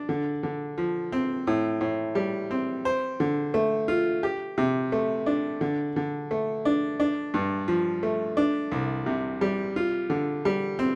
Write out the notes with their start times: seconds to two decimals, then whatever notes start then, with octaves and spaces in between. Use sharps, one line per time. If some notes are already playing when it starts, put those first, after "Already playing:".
Already playing: D4
0.09 D3
0.43 D3
0.78 F3
1.12 C4
1.47 A2
1.81 A2
2.15 G3
2.51 C4
2.85 C5
3.20 D3
3.54 A3
3.88 F4
4.23 G4
4.58 C3
4.92 A3
5.26 D4
5.61 D3
5.96 D3
6.31 A3
6.65 D4
7.00 D4
7.34 G2
7.68 F3
8.03 A3
8.37 D4
8.72 C2
9.06 C3
9.41 G3
9.76 F4
10.10 D3
10.45 G3
10.79 C4